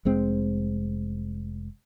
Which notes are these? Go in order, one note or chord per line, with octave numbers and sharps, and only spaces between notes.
F1 G#3 C4